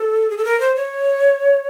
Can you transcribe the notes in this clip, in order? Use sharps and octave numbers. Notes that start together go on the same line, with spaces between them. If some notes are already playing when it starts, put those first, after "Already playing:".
Already playing: A4
G#4
A4
A#4
C5
C#5